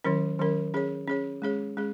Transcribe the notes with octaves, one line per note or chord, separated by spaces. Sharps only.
D#3 F#3 C#4 A#4
D#3 F#3 C#4 A#4
C#4 G#4 C#5
C#4 G#4 C#5
G#3 C#4 G#4 C#5
G#3 C#4 G#4